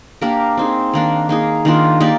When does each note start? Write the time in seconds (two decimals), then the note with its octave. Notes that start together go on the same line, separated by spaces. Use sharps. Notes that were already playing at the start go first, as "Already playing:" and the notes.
0.21 A#3 D4 G4 A#4
0.57 C4 D#4 G#4
0.93 D#3 A#3 D4
1.29 A#3 D#4 G#4
1.65 D#3 A#3 D4 F4
2.00 A#3 D#4 G4 D5